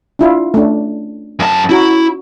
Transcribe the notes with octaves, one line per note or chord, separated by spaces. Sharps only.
D4 E4 F4
A3 C#4 D4
F#2 A5
C#4 E4 F#4 A#5